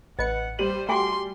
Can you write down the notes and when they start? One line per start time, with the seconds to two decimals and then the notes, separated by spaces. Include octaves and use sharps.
0.19 A1 B4 D#5 F#5 C#7
0.59 G3 C5 D#7 F#7
0.89 A3 F#4 G5 G#5 C6 D6